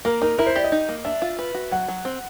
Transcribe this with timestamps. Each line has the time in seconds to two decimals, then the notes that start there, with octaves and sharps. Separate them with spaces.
0.05 A#3 A#4
0.22 D#4 A#4
0.38 E4 A#4
0.46 C5
0.56 G4 D5
0.64 D#5
0.72 D#4
0.89 A#3
1.05 D4 E5
1.22 F4
1.39 B4
1.54 F#4
1.71 F#3 F#5
1.88 F#3
2.05 C4